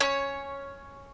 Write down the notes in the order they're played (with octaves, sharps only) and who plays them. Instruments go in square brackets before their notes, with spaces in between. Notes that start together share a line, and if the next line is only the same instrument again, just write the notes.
[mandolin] C#4 C#5